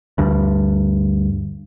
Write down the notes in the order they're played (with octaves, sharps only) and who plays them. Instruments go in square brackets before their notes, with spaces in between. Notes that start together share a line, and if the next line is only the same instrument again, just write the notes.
[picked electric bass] D2 G2